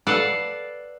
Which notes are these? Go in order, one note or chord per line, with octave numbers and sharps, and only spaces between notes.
A4 B4 D5 F5 F#5